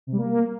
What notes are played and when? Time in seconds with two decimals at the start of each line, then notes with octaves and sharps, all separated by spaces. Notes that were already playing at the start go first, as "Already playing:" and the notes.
0.07 C3
0.12 G3
0.18 A#3